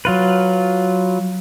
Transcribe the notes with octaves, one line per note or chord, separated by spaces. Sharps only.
F#3 F4 B4